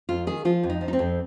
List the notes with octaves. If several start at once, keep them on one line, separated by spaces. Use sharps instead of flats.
F2 F4
D#3 G#4
F3 F4
F2
D#4
F3
D#4
C4
F2